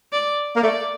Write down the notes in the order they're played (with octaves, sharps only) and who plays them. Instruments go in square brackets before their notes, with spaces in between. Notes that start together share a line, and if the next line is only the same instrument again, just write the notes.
[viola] D5
[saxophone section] A#3
[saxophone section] A3 [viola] D5